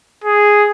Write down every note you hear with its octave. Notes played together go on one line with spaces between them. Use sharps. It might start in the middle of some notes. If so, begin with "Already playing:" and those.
G#4